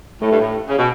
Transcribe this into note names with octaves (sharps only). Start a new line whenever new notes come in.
A2 A3
G2
A2
C#3
B2